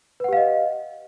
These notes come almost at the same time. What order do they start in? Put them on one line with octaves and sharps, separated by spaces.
B4 F#5 G4 F5 D#5